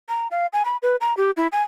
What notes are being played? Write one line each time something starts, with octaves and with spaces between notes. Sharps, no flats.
A#5
F5
G#5
B5
B4
A#5
G4
E4
G#5